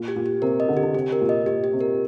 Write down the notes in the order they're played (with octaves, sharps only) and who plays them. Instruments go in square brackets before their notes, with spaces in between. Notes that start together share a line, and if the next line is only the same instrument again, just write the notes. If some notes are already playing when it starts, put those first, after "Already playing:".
Already playing: [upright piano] A#2
[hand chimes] G4
[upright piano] A#2
[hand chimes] G4
[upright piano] C3 [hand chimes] A#4
[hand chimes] D#5
[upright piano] D3
[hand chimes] G4
[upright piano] D3
[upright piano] C3 [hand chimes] G4
[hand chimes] A#4
[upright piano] A#2
[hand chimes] D#5
[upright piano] A#2 [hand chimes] G4
[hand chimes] G4
[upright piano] C3
[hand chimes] A#4